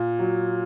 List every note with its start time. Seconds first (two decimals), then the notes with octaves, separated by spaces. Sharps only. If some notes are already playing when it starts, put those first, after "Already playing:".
Already playing: A#2
0.19 F#3